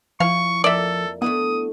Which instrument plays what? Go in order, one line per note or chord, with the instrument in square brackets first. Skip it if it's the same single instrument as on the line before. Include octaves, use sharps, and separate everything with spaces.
[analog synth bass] F3 [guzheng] E4 [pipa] F5 [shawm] C#6
[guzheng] F2 A#3 [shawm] A4 [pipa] D5 E5
[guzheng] A3 D4 E4 [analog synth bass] B3 [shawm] D#6